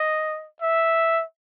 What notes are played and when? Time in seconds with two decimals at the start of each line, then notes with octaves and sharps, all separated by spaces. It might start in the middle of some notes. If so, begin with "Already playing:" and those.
Already playing: D#5
0.62 E5